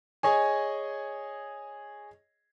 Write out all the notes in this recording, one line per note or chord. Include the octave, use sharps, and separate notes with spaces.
G#4 C#5 D#5 G#5